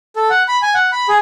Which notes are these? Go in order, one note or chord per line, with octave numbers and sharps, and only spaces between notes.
A4
F#5
B5
G#5
F#5
B5
G#4